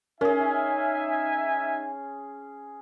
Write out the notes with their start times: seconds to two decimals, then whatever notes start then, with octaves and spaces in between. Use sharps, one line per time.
0.21 C#4 D#4 G#4 A#4 E5 G#5